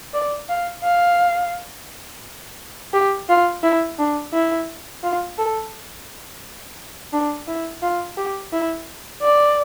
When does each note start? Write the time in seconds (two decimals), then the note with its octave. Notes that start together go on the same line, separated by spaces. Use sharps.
0.14 D5
0.49 F5
0.84 F5
2.93 G4
3.29 F4
3.63 E4
3.99 D4
4.33 E4
5.03 F4
5.38 A4
7.13 D4
7.48 E4
7.83 F4
8.17 G4
8.53 E4
9.22 D5